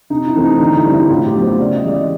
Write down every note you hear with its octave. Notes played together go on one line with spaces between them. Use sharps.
C3 D#4
E4
E3 A3 C4
D#4
D3 D#4
E4
G3 C4
E4
A2 F4
G4
F#3 B3
C5
C#3 D5
D#5
E3 G#3 D5
D#5